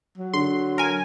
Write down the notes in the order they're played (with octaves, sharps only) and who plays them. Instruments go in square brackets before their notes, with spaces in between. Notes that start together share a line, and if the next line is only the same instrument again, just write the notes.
[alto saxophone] F#3
[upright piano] D3 [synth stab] C6
[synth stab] A#4 G#5